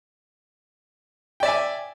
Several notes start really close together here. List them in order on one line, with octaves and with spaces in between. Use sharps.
G5 D5 E5 G#5